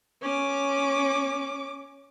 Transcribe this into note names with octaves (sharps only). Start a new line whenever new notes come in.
C#4 D6